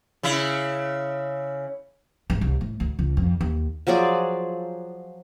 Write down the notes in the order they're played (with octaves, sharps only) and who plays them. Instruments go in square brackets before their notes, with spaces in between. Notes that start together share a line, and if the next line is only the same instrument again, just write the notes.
[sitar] C#3 E4
[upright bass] G#2
C2
A2
D2
C#2
F2
D#2
[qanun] F3 F#3 G#4 D5